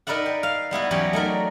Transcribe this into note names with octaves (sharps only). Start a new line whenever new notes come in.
D#4 A#4 B4 D5 E5 F#5
G5
F5
G3 B3 E4 F#4
E2 F#3 C#4 F#4 G4 G5
A3 D#4 A#4 D5